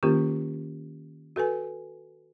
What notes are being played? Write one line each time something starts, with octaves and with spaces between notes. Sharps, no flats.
D#3 A#3 C#4 F4 G4 A#4
F#4 A4 B4 G#5